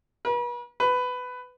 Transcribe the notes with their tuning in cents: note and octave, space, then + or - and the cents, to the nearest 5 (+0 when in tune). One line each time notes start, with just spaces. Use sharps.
B4 -40
B4 +15